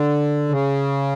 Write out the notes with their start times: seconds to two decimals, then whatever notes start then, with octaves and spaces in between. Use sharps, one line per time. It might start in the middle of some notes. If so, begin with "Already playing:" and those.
Already playing: D3
0.49 C#3